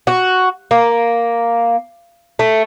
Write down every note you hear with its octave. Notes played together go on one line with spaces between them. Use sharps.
F#4
A#3
A3